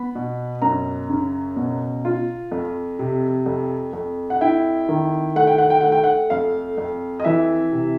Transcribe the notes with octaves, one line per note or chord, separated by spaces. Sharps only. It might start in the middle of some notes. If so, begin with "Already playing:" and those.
Already playing: B3 B5
B2
F#2 A#5
C#3
B2
F4
F2
C3
F2
F2
F#5
E4 G5
D#3
A3 F#5
G5
F#5
G5
A3 F#5
G5
F#5
F2 F5
F2
D#5
E3 E5
C3